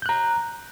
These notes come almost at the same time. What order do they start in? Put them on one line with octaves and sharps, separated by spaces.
G6 F#6 A#5